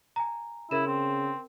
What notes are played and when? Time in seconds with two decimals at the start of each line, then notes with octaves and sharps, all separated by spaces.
0.16 G#5 A#5
0.71 C#3 E4 A#4 E7
0.87 C4